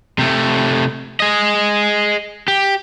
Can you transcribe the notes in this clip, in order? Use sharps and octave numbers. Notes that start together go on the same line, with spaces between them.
C3 A3
G#4 D#5
G4